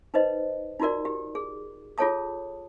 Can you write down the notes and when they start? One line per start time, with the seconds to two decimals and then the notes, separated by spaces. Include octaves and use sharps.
0.14 D#4 B4 C5 D#5
0.80 D#4 F4 F#4 A#4 D5
1.05 G4
1.35 G#4
1.98 F4 G#4 A4 C#5 A5 D#6